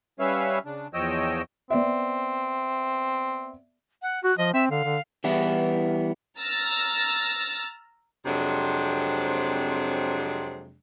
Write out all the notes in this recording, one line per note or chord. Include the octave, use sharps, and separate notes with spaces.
G3 C#4 B4 C#5 E5 F5
C#3 D4
E2 F3 C#5 D#5 G5 E6
B3 C4 D5 E5
F#5
F#4 F#6
F3 D#5
C4 E5
D3 F5
D3
E3 G3 B3 E4
A#5 E6 F6 A6 A#6
F2 C3 F#3 G#3 D4